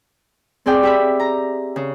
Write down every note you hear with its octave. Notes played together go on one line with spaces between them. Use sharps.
C4 G#4 D5 G5
G4 E5 B5
A#5
C#3